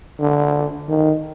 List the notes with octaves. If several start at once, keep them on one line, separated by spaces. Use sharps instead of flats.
D3
D#3